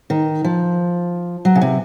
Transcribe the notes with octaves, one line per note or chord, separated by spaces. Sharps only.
D#3
F3
F#3
C#3
C3